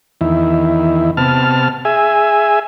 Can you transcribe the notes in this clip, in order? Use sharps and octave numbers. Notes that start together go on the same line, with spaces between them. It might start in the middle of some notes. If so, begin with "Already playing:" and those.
E2 D#3 E4
C3 B3 A5 F6
G#4 E5 G#5